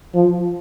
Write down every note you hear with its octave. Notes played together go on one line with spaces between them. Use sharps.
F3